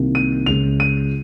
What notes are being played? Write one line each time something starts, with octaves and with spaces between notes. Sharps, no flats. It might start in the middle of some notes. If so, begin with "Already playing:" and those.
Already playing: C2 C3 D#3 A#3
D#7
C#2 C#3 G#3 F7
D#7